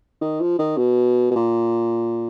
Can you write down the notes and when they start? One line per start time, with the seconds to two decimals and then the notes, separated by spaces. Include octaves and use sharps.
0.21 D#3
0.40 F3
0.59 D#3
0.77 B2
1.31 B2
1.36 A#2